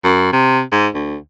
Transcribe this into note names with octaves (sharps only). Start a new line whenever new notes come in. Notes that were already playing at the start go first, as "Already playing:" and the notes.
F#2
C3
G#2
D2